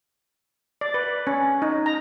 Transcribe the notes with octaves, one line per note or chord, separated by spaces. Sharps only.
D5
B4
C#4
D#4
A#5